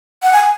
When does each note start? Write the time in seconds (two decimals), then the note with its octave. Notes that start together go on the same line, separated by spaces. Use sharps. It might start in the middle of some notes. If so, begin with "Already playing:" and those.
0.23 F#5
0.33 G#5